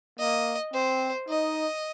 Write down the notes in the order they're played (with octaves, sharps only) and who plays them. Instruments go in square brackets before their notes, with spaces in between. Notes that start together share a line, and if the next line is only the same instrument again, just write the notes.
[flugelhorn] A#3 [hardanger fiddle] D#5
[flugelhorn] C4 [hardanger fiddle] C5
[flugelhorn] D#4 [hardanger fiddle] D#5